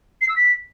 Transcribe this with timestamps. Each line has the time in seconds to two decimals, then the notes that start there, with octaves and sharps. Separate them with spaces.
0.21 C7
0.29 E6
0.36 B6